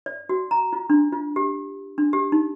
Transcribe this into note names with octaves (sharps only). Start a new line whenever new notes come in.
D5
F#4
A#5
F4
D4
F4
G4
D4
G4
D#4